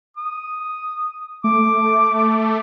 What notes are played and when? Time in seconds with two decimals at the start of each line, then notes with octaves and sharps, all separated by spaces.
0.17 D#6
1.44 A3 D6